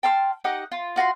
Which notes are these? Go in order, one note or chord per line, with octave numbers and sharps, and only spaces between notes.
G5 A5 C6 F6
D#4 G4 D#5 F#5
F4
F4 F#4 A#5 C6